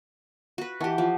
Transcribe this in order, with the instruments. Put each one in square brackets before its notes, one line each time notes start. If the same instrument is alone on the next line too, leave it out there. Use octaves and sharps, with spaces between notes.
[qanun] F#4 B4
[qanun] E3 G4 [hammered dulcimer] F#5 A5 C#6
[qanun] F3